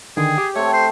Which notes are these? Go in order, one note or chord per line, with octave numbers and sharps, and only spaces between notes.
D3 D#3 G#4 G5
G4
A3 C4 C#5
C5